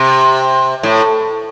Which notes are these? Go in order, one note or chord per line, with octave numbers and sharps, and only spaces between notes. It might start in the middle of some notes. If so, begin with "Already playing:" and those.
Already playing: C3
A2